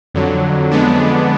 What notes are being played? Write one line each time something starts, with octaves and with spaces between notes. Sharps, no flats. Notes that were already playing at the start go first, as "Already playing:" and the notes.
F2 D3 F#3
F2 D3 G#3 B3 D4